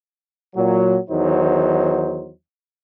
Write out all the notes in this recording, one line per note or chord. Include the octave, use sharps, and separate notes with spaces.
A#2 F#3
E2 D#3 F#3 D#4 C5